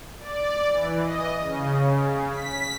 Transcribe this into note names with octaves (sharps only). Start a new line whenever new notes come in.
D5
E3
D#5
C#3
B6